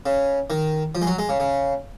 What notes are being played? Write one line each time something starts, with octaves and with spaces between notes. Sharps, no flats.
C#3
D#3
F3
G#3
F#3
G#3
C#3
C#3